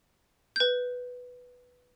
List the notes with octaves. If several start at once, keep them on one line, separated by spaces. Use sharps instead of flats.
B4 G6